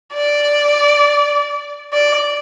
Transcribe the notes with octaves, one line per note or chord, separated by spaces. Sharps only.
D5
D5